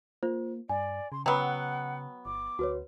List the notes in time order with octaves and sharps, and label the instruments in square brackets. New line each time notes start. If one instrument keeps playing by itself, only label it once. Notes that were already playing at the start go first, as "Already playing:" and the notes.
[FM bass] A#3 [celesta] F4 C5
[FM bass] G2 [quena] D5 [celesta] G#5
[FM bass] C#3 [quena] C6
[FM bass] C#3 [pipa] F#3 B3 [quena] F#5 [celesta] G5 E6
[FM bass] G1 [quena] D6
[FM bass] D2 [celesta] F#4 B4 C#5